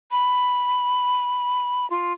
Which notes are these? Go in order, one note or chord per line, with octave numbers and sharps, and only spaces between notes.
B5
F4